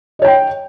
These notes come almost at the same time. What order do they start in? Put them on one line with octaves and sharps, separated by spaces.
D#5 C#5 G5